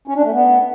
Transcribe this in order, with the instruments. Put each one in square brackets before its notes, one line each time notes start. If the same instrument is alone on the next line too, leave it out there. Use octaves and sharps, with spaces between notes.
[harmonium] C#4
D4
A3
B3